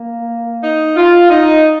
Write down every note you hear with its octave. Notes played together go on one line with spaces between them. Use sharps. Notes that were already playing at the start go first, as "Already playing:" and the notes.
Already playing: A#3
D#4
F4
D#4